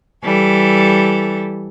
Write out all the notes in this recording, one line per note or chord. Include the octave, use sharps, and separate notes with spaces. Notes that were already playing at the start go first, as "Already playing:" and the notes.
E3 G3 A4